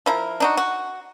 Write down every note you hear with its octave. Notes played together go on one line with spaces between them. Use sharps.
F3 E4 A#4
D4 D#4 F#4
F#4